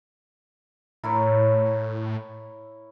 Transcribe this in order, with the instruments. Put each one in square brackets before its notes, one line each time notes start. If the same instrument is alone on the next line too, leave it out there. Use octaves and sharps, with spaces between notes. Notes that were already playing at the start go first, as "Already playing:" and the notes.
[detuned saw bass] A2 [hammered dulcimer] E4 A#4 C#5